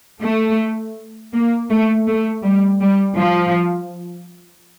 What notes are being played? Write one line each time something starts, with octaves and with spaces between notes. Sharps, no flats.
A3
A#3
A3
A3
G3
G3
F3